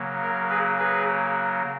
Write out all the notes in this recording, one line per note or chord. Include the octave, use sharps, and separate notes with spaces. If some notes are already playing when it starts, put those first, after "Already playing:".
Already playing: C#3 F#3 A#3
A#4
G#4 B4
G#4 B4